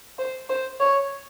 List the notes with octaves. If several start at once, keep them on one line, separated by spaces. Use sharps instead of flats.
C5
C5
C#5